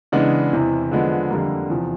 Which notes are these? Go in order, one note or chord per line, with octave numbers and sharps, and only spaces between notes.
C#3 E3 G#3 B3 D4
E2 C3 E3
D3 F3 G#3 B3
F2 D3 G3 A#3
E2 C3 F3